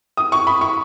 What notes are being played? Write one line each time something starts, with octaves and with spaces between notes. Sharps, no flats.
D#6
C#6
B5
C#6